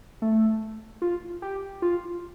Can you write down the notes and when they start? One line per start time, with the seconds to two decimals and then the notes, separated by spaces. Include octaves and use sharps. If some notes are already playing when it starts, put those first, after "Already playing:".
0.22 A3
1.02 F4
1.42 G4
1.82 F4